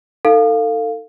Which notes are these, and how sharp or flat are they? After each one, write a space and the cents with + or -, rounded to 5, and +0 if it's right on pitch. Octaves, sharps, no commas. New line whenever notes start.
D#4 +0 A4 +30 F5 +5